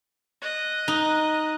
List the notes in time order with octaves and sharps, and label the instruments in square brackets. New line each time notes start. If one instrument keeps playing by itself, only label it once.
[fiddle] D#5 F#6
[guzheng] D#4